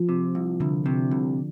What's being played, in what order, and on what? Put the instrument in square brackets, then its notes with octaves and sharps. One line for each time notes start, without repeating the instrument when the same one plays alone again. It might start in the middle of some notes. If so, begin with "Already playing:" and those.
Already playing: [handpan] F3
[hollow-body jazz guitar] C3
C2
[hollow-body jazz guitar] C2 [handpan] D3
[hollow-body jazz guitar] C3
C2